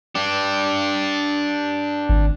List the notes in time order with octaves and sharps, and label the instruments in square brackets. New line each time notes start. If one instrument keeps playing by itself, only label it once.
[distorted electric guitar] D4 G4
[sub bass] G#1